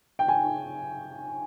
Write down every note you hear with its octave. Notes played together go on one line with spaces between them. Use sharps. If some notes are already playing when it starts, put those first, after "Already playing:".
G5
G#5